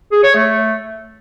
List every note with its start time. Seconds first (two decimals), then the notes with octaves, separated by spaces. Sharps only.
0.12 G#4
0.23 C#5
0.35 A3